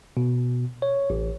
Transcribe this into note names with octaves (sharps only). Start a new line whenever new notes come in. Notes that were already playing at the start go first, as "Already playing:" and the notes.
B2
C#5
A1